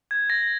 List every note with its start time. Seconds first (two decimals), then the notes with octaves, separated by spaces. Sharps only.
0.11 G#6
0.30 A#6